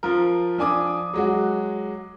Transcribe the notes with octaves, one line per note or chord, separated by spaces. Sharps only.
F3 F4 A#4
F3 D4 G#5 D6 D#6
F#3 G#3 F#4